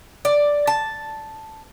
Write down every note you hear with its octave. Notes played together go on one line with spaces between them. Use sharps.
D5
A5